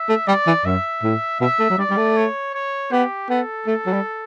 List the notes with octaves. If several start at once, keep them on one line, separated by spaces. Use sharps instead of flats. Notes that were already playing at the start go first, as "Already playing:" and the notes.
Already playing: E5
A3
G3 D5
E3
F#2 E5
A2
B2 E5
A3
F#3
G3 D5
G3
A3
C#5
C#5
B3 G4
B3 A4
A3
F#3
G3